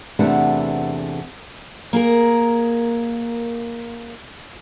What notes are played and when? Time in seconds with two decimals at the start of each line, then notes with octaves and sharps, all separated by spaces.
0.19 E2 C3 A3 B3 D4
1.93 A#3 G#4 A#4